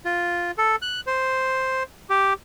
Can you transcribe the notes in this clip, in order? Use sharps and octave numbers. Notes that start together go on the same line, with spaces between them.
F4
A4
F#6
C5
G4